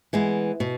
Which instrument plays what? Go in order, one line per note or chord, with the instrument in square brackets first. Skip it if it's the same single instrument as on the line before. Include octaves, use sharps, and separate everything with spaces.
[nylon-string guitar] E3 G#3 B3
B2